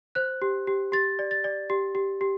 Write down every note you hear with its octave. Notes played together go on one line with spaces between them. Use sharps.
C5 F#6
G4
G4
G4 A6
D5
A6
D5
G4
G4
G4